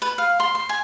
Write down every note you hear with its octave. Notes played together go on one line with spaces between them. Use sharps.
B4
F5
C6
C6
G#5